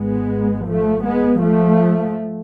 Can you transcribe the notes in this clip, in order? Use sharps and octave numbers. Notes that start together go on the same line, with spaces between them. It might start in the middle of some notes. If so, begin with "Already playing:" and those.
Already playing: G#1 G#2 G#3 B3
F3 A3
G#3 B3
F3 A3